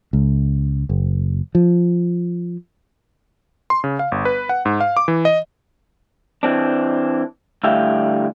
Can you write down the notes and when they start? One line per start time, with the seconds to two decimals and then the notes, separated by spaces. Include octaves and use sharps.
0.13 C#2
0.89 F#1
1.55 F3
3.70 C6
3.84 C#3
3.99 F5
4.12 G1
4.25 B4
4.49 F#5
4.65 G#2
4.81 F5
4.97 D6
5.08 E3
5.25 D#5
6.43 E3 C4 D4
7.64 D2 A2 G3 E5 F5 G5